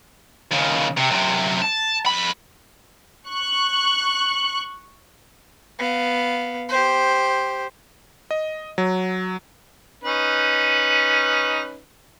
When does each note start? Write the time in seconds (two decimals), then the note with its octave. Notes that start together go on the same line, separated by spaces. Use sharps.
0.51 D#2 C#3
0.97 C3
1.10 F#2 C3
1.62 A5
2.06 F2 B5
3.28 C#6 F#6
5.79 B3 F5
6.69 G4 C5
8.31 D#5
8.78 F#3
10.04 C#4 D#4 B4